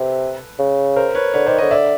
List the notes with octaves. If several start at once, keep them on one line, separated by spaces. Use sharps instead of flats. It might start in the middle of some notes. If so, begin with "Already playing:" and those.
Already playing: C3 A4 B4
C#3
A#4 C5
B4 C#5
D3 B4 C#5
D#3 C5 D5
D3 C#5 D#5
D5 E5